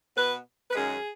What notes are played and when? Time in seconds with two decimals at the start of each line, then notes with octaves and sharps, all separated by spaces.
0.16 B2 B3 B4
0.70 B4
0.74 F#2 D#3 G#3 C#4 G#4